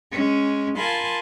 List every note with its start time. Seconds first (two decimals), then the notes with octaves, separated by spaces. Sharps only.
0.11 G#3 C#4
0.77 F4 A#4 G#5 A5 B5 C6